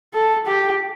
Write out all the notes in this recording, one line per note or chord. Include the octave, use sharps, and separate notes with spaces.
A4
G4